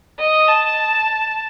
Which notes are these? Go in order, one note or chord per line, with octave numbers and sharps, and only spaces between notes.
D#5
A5